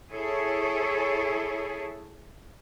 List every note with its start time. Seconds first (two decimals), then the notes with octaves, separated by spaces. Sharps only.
0.11 E4 G#4 A4 C#5